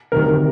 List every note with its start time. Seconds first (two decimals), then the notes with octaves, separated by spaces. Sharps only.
0.12 D2 C3 D#3 A#4
0.26 A#4